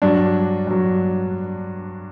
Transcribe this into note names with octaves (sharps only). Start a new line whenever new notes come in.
G2 F#3 D4
G2 F#3